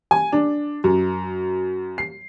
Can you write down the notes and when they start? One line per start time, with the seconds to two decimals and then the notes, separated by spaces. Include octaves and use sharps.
0.11 G#5
0.32 D4
0.84 F#2
1.98 C7